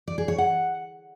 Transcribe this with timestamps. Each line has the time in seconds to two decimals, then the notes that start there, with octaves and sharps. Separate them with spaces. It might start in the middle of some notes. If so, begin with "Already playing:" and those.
0.08 D5
0.18 G#4
0.28 C#5
0.38 F#5